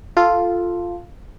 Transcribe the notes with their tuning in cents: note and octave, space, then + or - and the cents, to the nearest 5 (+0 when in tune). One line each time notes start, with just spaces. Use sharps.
F4 +0 A4 +0